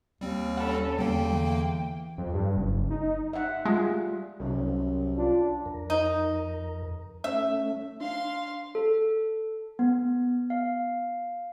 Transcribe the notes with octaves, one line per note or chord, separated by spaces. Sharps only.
D#2 G3 C4
C#4 A4 F#5 B5
E2 D3 G3 A#3 G5
E3
F2
G2
F#1
D#4
E5 F#5
G3 G#3 F4
C2 F#2
D4 F4
F2 A#4
D#4
A3 C#4 E5
D4 F5 C6
A4
B3
F5